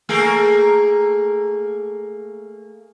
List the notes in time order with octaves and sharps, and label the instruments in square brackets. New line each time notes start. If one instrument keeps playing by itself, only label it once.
[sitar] A3 A#3 G#4